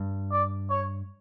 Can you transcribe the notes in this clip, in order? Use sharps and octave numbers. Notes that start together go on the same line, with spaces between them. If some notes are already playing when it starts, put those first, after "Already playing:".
Already playing: G2
D5
C#5